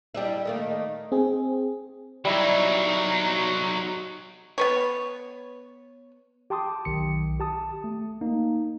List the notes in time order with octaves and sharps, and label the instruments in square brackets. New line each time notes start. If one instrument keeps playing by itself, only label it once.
[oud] G3 D4 E4
D#3 A3 A#3
[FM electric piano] C4 G#4
[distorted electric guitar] F#3 D#4 [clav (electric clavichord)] G3 E4
[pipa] B3 B4 C#5
[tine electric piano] G4 G5 A5 C6 D6 D#6
B1 D#3 C#7
G4 A5 D#6
A3
A#3 D#4